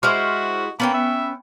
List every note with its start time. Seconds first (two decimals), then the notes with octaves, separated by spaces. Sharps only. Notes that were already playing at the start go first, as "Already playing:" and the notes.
0.03 G#3 E4 F#4 C5 C#6 F6
0.80 A#3 B3 C#4 G5 B5
0.94 E5